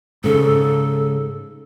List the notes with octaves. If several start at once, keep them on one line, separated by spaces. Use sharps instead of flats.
G#2 C#3 A4